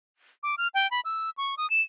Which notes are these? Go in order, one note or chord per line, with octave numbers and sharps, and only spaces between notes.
D6
F6
G5
B5
E6
C#6
D#6
E7